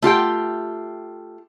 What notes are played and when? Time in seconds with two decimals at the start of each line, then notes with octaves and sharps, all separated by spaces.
0.02 A3 F4 G4 G5